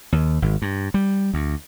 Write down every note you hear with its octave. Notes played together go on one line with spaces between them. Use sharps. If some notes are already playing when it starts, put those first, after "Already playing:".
D#2
G#1
G2
G3
D2